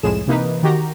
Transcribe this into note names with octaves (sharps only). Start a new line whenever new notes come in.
C2 F2 A2 G#3 G#4 E7
C3 E3 A#3 D#4 B4
D#3 F#4 G4 A#5